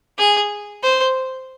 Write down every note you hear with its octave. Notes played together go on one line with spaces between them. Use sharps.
G#4
C5